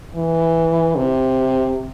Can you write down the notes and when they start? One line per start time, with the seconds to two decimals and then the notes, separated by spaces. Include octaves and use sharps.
0.16 E3
0.96 C3